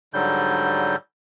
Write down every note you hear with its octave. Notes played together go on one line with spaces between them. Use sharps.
G#2 D3 F#3 G3 G6